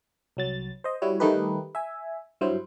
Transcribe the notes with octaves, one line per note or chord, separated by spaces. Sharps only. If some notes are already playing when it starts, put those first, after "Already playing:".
C2 F#3 A6
C5 D#5
G3 E4 F#4 C#5
D#3 G3 A3 D#4 G4 B4
E5 G#5
G2 F#3 E4 C5